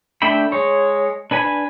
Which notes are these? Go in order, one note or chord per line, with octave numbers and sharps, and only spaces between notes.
A3 D4 E5 G5 B5
G#3 C#5
D4 B4 G#5 B5